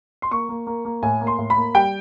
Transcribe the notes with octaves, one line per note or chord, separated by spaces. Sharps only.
C6
A#3 C#6
A#3
A#3
A#3
A2 G#5
A#3
C6
A2
B5
A#3
G3 G5